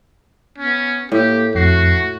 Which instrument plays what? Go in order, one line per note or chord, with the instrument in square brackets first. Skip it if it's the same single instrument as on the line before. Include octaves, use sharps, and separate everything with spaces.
[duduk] B3 [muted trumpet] C#4
[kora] A2 [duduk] A#3 [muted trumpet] G4
[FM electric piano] F2 C7 [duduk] A3 [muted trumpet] F#4